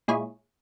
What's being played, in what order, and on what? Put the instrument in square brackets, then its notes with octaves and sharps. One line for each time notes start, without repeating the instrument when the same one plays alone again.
[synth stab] A#2 G#3 E4 G#4 C#5